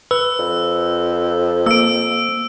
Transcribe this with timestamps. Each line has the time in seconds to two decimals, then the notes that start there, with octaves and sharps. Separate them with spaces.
0.11 B4 E6
0.39 F2
1.66 A#3 E6 D7